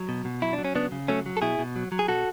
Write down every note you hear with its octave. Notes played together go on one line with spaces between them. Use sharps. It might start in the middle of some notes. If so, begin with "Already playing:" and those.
Already playing: F#3
B2
B2
F#3 E4
D4
F#3
C#4
C#3 B3 D4
C#3
F#3 A3 C#4
F#3
A4
B2 E4 G#4
B2
F#3
F#3
G#4
B2 F#4 A4